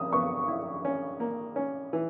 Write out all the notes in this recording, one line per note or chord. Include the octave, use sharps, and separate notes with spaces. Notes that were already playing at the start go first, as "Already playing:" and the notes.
Already playing: D#6 E6
B3 C#6
E4
C#4
A#3
C#4
E3